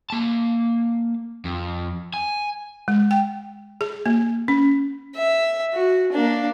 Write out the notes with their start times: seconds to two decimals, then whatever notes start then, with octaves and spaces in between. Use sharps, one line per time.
0.10 A#3 A5
1.45 F2
2.14 G#5
2.88 G#3
3.11 G5
3.81 G#4
4.06 A#3
4.48 C#4
5.16 E5
5.74 F#4
6.12 A#3 D4